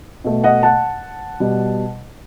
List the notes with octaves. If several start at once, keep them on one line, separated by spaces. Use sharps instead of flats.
B2 A3
D#5 F#5
F#5 A5
B2 G3